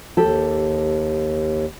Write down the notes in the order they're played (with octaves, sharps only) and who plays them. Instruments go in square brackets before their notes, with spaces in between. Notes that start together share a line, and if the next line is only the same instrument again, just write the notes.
[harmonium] D#2 [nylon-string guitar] G4 A4